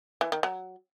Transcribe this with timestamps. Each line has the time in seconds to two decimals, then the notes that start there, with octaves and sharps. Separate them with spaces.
0.21 E3
0.32 D#3
0.43 F#3